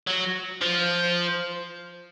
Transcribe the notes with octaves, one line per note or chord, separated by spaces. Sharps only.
F#3
F3